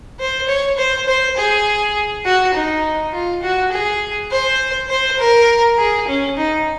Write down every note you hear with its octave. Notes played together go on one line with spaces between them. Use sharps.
C5
C#5
C5
C5
G#4
F#4
D#4
F4
F#4
G#4
C5
C5
A#4
G#4
C#4
D#4